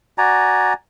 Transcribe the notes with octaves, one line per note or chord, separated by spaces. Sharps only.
F#4 D5 G#5 A#5